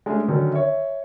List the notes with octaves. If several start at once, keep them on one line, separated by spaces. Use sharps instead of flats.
G#3 A3 C#4 D4 G#4 G#5
D3 D#3 F#3 C#4
C#5 E5